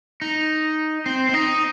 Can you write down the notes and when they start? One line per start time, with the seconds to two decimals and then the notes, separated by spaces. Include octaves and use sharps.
0.22 D#4
1.06 C4
1.29 C4
1.34 D#4